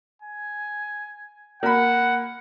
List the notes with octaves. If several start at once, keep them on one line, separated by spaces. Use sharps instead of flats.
G#5
A#3 F#5 B5